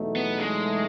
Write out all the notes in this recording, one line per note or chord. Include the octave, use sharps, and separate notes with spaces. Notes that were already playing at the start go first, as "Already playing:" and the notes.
Already playing: E2 B2 F#3 A3 D#4
B3
G#3